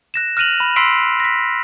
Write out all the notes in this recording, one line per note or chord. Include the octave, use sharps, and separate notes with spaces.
F#6 A#6 E7
F6 F#6 A#6 D#7 F7 F#7
B5
C6 E6 B6 C7 D7
A#6 B6